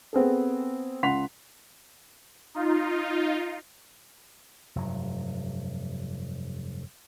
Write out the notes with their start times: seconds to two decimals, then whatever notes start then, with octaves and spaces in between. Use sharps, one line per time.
0.13 B3 C4 G#4 A4
1.03 C#2 F#5 C6 B6 F7
2.55 D#4 F4
4.76 F1 G2 F#3